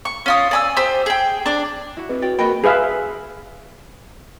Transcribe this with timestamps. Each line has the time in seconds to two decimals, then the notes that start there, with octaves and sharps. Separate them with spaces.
0.05 C#6
0.26 C#4 F4 D#6
0.51 D5 G#5 E6
0.77 G4 C5 E6
1.06 G#4 G5
1.46 D4 D5
1.97 E4 F#4
2.09 C4 G#4 B4 D#5
2.22 F#4 C#5 D5 G5
2.39 A#3 F#4 A#4 D#5 G5 B5
2.64 G#4 B4 E5 F5